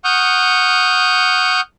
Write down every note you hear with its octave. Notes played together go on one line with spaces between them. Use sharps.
F#5 C#6 D#6 F6 G6